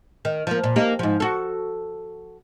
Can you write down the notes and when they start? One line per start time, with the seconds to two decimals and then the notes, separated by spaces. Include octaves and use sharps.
0.25 D#3
0.47 F3 A#3
0.63 A#2
0.76 A#3 D#4 G4
0.99 G#2 F3
1.20 F#4 A4